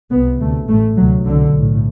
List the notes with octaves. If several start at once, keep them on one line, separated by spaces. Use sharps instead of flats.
C2 C3 B3
D2 C3 A3
A1 A2 A3
D2 C3 F#3
C2 B2 D3
B1
A2